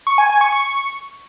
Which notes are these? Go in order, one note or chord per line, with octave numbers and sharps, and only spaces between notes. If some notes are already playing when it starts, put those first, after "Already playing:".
C#6
G#5
G#5
C#6
C#6